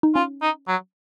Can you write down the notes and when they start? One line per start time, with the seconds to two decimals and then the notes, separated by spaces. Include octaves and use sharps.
0.03 D#4
0.15 C#4 F4
0.42 D#4
0.68 F#3